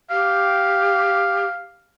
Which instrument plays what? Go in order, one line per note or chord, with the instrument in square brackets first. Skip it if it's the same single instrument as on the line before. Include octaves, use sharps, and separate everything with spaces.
[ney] G4 [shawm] F5